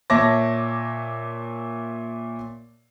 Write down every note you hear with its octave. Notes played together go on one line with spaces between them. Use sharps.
A#2 C#5 E5 A5 D6 A#6